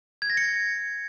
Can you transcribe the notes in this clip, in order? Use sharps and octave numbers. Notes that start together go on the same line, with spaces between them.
G#6
A#6
C#7